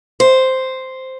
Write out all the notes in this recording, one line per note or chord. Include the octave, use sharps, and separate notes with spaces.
C5